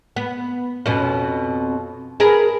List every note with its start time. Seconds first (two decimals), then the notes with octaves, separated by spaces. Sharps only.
0.16 B3
0.86 F2 B2 C#4
2.20 G#4 A#4 B4